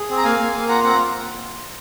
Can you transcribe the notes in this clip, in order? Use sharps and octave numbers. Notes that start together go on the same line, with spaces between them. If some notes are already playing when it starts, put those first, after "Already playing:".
Already playing: G#4
C4
A#5
A#3 F5 G#5
A#3
A#3
F4 F#5 A#5
C4 F#5 A#5